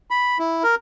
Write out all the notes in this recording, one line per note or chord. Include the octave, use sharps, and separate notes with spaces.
B5
E4
A#4